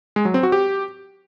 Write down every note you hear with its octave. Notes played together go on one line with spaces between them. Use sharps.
G#3
F#3
C4
F#4
G4